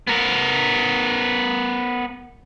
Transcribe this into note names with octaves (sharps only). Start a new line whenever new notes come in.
B3 A#4